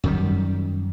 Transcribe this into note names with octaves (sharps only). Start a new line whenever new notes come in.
F#2 D#3 G3